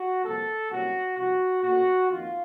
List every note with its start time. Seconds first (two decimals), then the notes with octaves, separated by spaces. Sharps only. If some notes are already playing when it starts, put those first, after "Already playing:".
Already playing: F#4
0.23 C2 A#2 F3 A#3 A4
0.70 C2 A#2 F#3 A#3 C#4 F#4
1.17 C2 C3 F3 F#4
1.63 A#2 A3 C#4 F#4
2.10 F2 D#3 A#3 F4